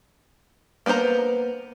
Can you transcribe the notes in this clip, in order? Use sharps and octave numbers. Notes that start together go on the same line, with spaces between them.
A#3 B3 F#4 C5 A#5